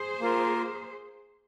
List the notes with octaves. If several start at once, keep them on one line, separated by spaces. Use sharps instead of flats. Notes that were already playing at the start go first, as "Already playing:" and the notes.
Already playing: G#4 C5
A#3 F4 A#4